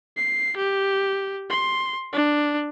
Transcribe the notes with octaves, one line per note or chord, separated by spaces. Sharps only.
C7
G4
C6
D4